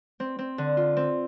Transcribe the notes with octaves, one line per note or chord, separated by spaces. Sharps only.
C4
C4
D3
F4
C4